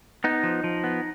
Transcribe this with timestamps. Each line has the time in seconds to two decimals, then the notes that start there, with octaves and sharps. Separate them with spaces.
0.24 B3 D#4
0.43 F3
0.64 F3
0.84 B3